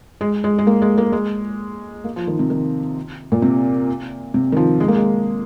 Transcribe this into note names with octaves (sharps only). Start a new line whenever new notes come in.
G#3
G#3
G#3
A#3
G#3
A#3
G#3
A#3
F3
D#3
C3
D#3
A#2
C3
C3
D#3
F3
G#3
A#3
G#3